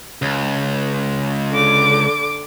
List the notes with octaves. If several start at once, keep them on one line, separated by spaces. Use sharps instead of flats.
C#2
D3 D6